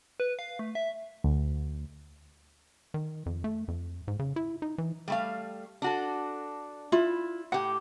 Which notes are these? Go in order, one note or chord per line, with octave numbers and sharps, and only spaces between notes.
B4
F5
A3
E5
D2
D#3
F2
A3
F2
G#2
C#3
E4
D#4
E3
G3 A3 F5
D4 F#4 A4
E4 F4
A2 G4 F#5